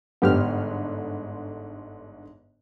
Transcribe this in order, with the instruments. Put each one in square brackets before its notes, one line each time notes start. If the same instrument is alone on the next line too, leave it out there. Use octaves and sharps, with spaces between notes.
[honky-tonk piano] G1 G#2 D3 [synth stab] B3 G4 F6